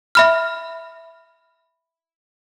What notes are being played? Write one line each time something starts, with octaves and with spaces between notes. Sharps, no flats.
E5 B5 F6